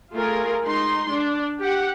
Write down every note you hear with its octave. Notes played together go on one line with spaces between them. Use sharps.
A3 F4 G#4 A#4
G#3 D#4 C6
D4
G4 F#5